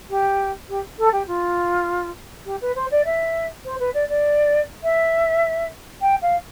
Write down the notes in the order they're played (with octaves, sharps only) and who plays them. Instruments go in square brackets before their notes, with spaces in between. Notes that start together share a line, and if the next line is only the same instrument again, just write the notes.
[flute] G4
G4
A4
G4
F4
G4
B4
C5
D5
E5
C5
B4
D5
D5
E5
G5
F5